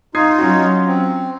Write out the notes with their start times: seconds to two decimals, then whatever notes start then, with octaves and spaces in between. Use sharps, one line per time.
0.15 D#4 F4 D#6 G#6 C7
0.38 F#3 C#4 F#4
0.87 C4